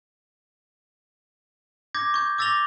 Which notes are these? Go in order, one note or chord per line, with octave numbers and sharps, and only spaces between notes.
D6 G6 G#6 A#6
C#6 G6
D6 E6 A6 A#6 F7 G7